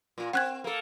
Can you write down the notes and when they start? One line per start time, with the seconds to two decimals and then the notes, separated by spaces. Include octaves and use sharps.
0.18 A#2 F4
0.33 C4 F#5 F#6 G#6
0.64 A#3 A4